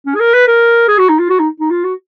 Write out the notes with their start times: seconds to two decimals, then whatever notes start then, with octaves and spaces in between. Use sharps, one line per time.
0.06 C#4
0.15 G#4
0.20 A#4
0.34 B4
0.47 A#4
0.88 G#4
0.98 F#4
1.09 D#4
1.19 F4
1.30 F#4
1.39 D#4
1.60 D#4
1.70 F4
1.84 F#4